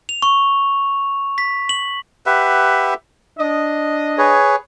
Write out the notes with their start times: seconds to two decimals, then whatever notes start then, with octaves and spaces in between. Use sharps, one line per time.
0.09 F7
0.22 C#6
1.38 B6
1.69 F#7
2.26 G4 B4 E5 F#5
3.39 D4 D#5
4.18 G#4 B4 C#5